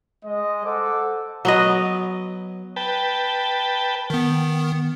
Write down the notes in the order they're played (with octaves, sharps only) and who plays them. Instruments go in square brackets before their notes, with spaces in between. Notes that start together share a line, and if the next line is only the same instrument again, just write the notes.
[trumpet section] G#3 D#5
A4 C5 F#5 D6
[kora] F#3 B3 D#5
[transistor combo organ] B4 G5 A5
[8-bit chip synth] D#3 B3